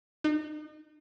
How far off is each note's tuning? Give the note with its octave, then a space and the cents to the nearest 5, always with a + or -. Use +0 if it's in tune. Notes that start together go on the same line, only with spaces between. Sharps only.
D#4 -35